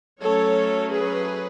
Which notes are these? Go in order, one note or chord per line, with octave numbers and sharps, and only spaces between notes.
F#3 A3 C#4 A4 C#5
G#4 B4